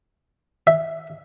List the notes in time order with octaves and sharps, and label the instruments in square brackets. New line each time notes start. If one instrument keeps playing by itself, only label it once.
[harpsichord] E5